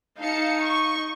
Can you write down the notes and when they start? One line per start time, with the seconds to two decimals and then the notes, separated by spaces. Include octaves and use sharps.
0.19 D#4 F5 A5 C#7
0.61 C#6